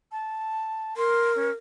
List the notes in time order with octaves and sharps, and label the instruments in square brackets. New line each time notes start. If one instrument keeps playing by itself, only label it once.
[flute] A5
[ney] A#4 [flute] C6
[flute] C#4